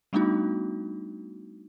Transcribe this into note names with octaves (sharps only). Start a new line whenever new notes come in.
G3 A3 B3 D4 D#4 F#4